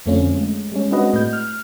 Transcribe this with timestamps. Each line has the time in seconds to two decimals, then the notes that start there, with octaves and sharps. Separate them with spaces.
0.06 F2 D3 A3 C4 C#4 F4
0.37 G#3
0.72 G3 G#3 C#4
0.91 G#3 C4 D4 F#4 B4 D#5
1.13 A2 G6
1.33 F6